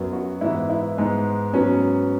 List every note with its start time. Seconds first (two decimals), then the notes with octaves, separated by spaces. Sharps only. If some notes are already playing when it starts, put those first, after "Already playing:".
Already playing: F#2 F#3 B3
0.13 F#4
0.41 G#2 E3 B3 E4
0.70 E4
0.97 G#2 G#3 B3
1.53 G#2 F#3 B3 C#4